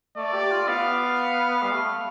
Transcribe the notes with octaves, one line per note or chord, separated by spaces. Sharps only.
A3 D5
G4
F4
B3 F5
G3
A3